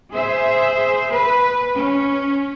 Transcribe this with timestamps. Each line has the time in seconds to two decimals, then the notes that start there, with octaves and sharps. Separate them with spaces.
0.12 G#4 C5 E5
1.12 B4
1.76 C#4